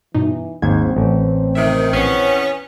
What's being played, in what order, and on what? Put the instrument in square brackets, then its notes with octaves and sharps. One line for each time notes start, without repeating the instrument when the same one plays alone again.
[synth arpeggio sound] G2 B2 D#4 [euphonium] E3
[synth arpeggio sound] G#1 G#6 [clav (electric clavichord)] D#2 G#2 [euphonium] C4
[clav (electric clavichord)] A1
[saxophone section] C3 D#3 [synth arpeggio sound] E5
[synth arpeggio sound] A#1 C7 [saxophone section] E2 B3 C#4